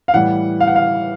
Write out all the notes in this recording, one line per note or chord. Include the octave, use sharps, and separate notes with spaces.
F5
A2 E3 G3 F#5
F5
F#5
F5